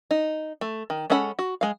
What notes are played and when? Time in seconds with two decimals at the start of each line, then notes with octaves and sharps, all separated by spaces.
0.11 D#4
0.61 A3
0.90 D#3
1.10 G#3 C#4 A4 F#5 B5
1.39 F#4
1.61 G#3 F5